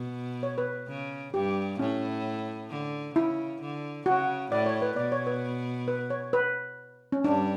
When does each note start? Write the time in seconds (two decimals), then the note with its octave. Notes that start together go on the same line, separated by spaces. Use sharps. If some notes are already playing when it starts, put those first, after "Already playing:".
Already playing: B2
0.43 C#5
0.58 B4
0.88 C#3
1.34 G2 G4
1.79 A2 C#4
2.70 D3
3.15 C#3 E4
3.61 D3
4.06 C#3 F#4
4.51 A2 D5
4.66 C#5
4.82 B4
4.96 B2 D5
5.12 C#5
5.27 B4
5.88 B4
6.10 C#5
6.33 B4
7.12 C#4
7.24 G2 D4